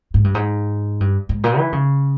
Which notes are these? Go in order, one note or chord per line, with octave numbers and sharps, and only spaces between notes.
G#2
G2
G#2
G2
G#2
A#2
E3
C#3